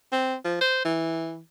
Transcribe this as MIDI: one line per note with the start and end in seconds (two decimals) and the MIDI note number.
0.12 0.35 60
0.44 0.59 53
0.61 0.82 72
0.84 1.39 52